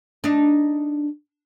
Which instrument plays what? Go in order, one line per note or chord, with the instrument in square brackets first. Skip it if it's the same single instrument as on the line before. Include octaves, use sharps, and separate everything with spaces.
[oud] D4 D#4